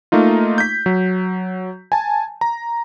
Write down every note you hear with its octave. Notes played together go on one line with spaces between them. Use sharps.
A3 A#3 D#4 F4
G6 B6
F#3
G#5 A5
A#5